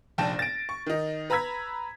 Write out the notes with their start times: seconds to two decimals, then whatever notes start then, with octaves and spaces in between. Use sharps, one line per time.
0.18 F1 A#1 G5 A5 A#6 E7
0.39 A6 A#6 D7
0.69 C#6
0.86 D#3 D#4
1.30 B4 A#5 B5 E6 G#6 B6